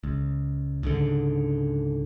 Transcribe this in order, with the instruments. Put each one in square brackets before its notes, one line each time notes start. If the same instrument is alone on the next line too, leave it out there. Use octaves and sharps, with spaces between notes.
[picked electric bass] C#2
C#2 G#2 D3